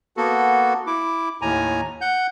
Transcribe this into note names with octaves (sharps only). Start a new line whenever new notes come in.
A#3 B3 F#4 A4
E4 D6
D#2 A2 G#5 A#5
F#5 G6